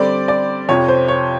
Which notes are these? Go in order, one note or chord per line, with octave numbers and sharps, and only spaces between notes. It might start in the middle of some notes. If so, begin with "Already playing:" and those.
Already playing: D3 G3 C4 D5
D5
F2 C3 F3 C#5
C5
C#5